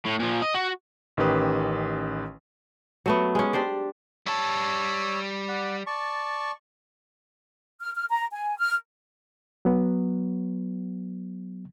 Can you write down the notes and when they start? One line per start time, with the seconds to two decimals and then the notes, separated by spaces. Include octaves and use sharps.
0.05 A2
0.19 A#2 F3
0.42 D#5
0.54 F#4
1.17 A1 D#3 C#4 G4 B4 D#6
3.06 F#3 A3 B3
3.35 G#3 C#4
3.53 D4 G4 C5 D5
4.26 G3 C#5 A5 E6
5.48 D5 F#5
5.87 D5 A5 C#6
7.80 F6
7.95 F6
8.09 A#5
8.31 G#5
8.59 F6
9.65 F#3 B3